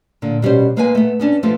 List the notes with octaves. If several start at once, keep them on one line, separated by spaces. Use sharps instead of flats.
A#2 D3
B2 G3 C#4 C5
G#3 A#3 D#4 B4 E5 G#5
A3 B3
B3 C#4 D4
F3 A3 B3 F4